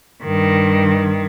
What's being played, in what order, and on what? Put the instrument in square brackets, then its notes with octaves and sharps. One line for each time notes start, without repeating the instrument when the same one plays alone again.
[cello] G2 D#3